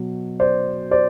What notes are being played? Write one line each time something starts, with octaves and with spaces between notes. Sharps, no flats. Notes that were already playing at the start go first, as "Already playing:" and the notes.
Already playing: B2 F#3
C5 D5
C5 D5